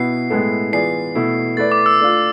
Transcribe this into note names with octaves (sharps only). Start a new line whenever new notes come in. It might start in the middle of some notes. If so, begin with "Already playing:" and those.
Already playing: B2 B3 E4 C7
A2 G#3 B3 E4 A4
E3 B3 F4 G#4 D5 C7
B2 A3 E4
A3 E4 B4 D5 A6
D6
E6
A3 D4 F4